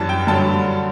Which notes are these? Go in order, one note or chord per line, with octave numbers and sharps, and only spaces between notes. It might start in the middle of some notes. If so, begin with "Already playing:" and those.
Already playing: F#2 E3 G3 A5
G5
G2 D3 F#3 A5